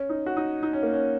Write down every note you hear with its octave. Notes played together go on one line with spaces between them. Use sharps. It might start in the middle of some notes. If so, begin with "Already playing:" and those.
Already playing: C#4
D#4
F#4
D#4
D#4
C#4
A#3
C#4